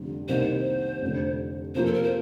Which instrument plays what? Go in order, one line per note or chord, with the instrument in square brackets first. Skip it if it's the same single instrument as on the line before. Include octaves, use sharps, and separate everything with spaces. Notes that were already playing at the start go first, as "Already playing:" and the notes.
Already playing: [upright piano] F1 F2 D3 G3
[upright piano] C2 C3 D#3 A#3 D#4 [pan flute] C5
[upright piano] F1 F2 D3
[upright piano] C3 F3 A#3 F4 [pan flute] C5
[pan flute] A4
A#4
C5